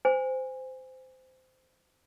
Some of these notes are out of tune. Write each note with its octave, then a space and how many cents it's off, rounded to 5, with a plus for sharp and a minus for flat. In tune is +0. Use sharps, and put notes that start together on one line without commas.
C5 -20 G#5 -25